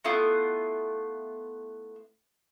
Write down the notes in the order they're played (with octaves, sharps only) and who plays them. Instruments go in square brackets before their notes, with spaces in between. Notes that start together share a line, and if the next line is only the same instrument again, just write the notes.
[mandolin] A3 B3 E4 F4